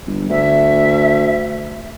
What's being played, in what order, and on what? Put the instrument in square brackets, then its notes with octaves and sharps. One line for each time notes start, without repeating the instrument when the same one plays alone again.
[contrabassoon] G1
[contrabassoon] D2 [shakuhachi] E5